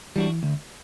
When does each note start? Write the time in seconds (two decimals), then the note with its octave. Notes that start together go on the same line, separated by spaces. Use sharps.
0.16 E3 G3 D4 F#4
0.43 D2